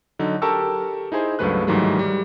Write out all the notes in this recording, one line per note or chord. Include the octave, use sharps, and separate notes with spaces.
D3 F#3 D#4
G4 A4 A#4 A5 C#6 E6
D#4 E4 G#4 C5
C#2 G2 F#3 A3 B4 F#6
G#2 D#3 E3 F#3 G3 A3
G3